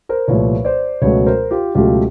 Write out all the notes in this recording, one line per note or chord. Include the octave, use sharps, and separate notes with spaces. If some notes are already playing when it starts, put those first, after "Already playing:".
A#4 C5
C2 A#2 F3 A3 B4 C#5
C5 D5
C#2 B2 F#3 A3 B4 C#5
A#4 C5
F4 G4
C#2 B2 F#3 A3 F4 G4